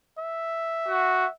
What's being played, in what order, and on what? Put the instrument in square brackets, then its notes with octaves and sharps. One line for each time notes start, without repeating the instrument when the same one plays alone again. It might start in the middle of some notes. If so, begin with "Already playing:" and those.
[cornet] E5
[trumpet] F#4